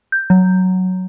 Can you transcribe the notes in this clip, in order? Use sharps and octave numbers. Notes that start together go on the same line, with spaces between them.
G6
F#3